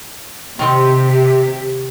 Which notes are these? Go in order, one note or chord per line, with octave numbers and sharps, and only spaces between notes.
C3 D#3 C4 G4